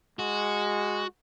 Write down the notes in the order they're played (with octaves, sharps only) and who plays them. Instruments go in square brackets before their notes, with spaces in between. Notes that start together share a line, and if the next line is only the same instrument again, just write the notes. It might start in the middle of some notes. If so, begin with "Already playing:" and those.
[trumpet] G#3 [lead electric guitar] F#4